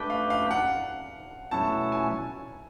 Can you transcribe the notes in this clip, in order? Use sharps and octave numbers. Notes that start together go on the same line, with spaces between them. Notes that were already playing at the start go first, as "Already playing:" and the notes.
Already playing: A3 D4 G4 B4
F5
F5
F#5
B2 F#3 A3 C#4 E4 A5
G#5